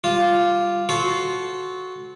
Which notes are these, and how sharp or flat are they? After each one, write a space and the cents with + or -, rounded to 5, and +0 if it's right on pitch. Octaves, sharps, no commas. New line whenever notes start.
G3 +0 F4 +0
F#4 +0 A4 -25 C5 +0